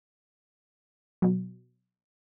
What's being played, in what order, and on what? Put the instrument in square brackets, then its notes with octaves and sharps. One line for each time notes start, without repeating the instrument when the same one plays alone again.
[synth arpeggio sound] B2 F#3